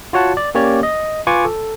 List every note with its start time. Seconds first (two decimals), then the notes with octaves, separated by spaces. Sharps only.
0.13 F4 F#4 C#5 F#5 A5
0.37 D5
0.55 A#3 C#4 G4 C#5 D5
0.83 D#5
1.27 F4 B4 G#5 C#6 D6
1.45 A4